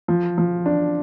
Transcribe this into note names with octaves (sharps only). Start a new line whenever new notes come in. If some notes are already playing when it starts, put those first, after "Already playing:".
F3
F3
D4